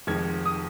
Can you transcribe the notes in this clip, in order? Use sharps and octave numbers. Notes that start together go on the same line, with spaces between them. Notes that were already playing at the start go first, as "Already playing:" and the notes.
F1 F2 D#3 G#3 D#4 G#6
D#6